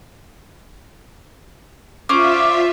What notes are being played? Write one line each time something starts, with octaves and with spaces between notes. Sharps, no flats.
C#4 F4 C5 D5 E5 D6